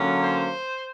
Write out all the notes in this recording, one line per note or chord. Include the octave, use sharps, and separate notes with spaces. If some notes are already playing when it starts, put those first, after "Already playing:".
Already playing: D3 F#3 A#3 C#4
C5